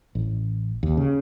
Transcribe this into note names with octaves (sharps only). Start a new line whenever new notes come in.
A1
D#2
C#3